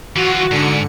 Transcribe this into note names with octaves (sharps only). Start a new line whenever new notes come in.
E3 F4 F#4
G#2 D3 C#7